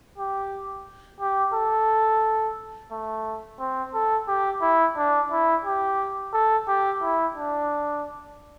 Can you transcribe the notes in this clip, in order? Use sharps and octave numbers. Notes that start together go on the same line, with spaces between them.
G4
G4
A4
A3
C4
A4
G4
E4
D4
E4
G4
A4
G4
E4
D4